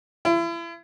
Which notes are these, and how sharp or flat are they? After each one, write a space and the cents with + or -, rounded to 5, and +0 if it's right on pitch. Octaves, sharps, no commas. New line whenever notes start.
E4 +35